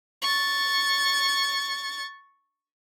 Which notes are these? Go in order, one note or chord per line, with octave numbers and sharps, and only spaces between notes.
C#6 A6